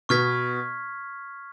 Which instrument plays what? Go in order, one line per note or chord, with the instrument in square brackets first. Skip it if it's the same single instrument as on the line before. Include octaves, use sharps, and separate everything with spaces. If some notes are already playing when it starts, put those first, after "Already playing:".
[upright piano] B2 B3 [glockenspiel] C#6 F6 G#6 B6